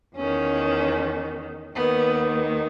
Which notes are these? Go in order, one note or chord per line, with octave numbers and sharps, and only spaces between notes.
E2 D#3 C#4
D#2 D#3 B3